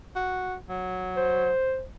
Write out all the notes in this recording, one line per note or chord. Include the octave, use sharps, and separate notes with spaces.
F#4
F#3
C5